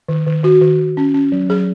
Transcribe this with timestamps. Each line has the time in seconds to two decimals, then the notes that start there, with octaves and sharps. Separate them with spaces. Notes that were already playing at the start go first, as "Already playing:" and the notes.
0.09 D#3
0.26 D#3
0.44 D#3 F#4
0.62 D#3
0.79 D#3
0.97 C#4
1.14 C#4
1.32 F#3
1.49 F#3 G#4